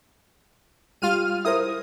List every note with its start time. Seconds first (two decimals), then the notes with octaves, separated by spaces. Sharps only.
1.02 G3 F4 F6 D#7
1.45 E4 A#4 C5 D#6